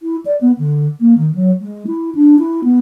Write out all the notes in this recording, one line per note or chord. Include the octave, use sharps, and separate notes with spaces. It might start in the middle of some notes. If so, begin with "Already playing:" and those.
E4
D5
B3
D3
A#3
D#3
F#3
G#3
E4
D4
E4
B3